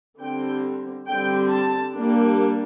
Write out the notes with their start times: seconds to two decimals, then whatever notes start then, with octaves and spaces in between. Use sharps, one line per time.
0.20 D3 G3 C4 G5
1.08 D3 G3 C4 G5
1.51 A5
1.95 G3 A#3 D4